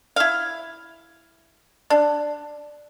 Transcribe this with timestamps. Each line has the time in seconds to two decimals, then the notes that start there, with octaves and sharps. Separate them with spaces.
0.16 E4 F5
1.90 D4